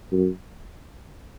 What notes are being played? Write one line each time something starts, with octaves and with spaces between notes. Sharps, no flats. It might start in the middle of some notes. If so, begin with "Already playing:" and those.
F#2